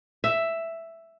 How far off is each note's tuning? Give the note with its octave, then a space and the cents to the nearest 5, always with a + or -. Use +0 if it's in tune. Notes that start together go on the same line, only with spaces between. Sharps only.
E5 +5